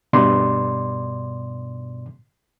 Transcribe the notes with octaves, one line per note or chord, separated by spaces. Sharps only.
G2 B2 D5 C6